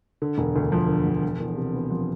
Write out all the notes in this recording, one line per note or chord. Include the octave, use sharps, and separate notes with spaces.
D3
E1
D2
F3
D3
E1
F3
E2
C3
B3
F3